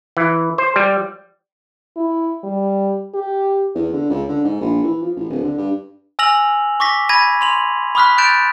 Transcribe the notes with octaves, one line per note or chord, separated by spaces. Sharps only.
E3
C5
G3
E4
G3
G4
E2
D3
C#2
D3
G#2
A#1
E3
F3
A1
D1
D3
G2
G#5 E6 F6 A#6 F7 F#7
C#6 D6 A#6 B6
B5 G#6 A#6 D#7
C6 F7 F#7
B5 C#6 D#6 F6 F#6 B6
F#6 G6 A6 D7 E7 F7